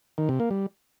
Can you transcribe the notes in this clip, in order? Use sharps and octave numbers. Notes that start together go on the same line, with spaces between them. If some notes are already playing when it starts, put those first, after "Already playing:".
D#3
C3
A#3
G3